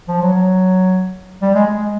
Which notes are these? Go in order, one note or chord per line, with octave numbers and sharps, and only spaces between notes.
F3
F#3
F#3
G3
G#3
G#3
G#3